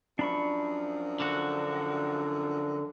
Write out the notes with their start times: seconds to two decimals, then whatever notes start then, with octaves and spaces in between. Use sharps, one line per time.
0.19 F#2 F3 D4 B5 C#6
1.20 D3 F#4